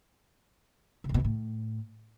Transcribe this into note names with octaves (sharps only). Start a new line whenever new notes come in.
C#3
F2
B2
E2
A2